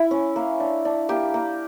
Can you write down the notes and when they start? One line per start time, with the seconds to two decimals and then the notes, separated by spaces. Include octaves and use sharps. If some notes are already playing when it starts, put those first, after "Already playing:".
Already playing: E4
0.11 C#4
0.36 A#3
0.60 D4
0.85 D4
1.09 A#3 G4
1.34 A#3